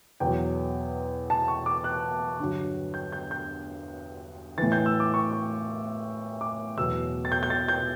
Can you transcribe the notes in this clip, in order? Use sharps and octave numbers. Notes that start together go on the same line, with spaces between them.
E2 B2 F#3 G5
A5
C#6
D6
F#6
G2 D3 F#3
G6
G6
G6
A2 E3 A6
G6
E6
D6
C#6
C#6
D6
E2 B2 F#3 E6
A6
G6
G6
A6
G6